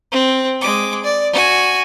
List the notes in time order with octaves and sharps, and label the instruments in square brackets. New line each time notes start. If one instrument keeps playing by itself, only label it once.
[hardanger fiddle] C4
G#3 D6
D5
F#4 G#5